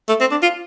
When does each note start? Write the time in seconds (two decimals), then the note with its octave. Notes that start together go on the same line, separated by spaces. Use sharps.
0.09 A3
0.21 C4
0.31 D4
0.43 F4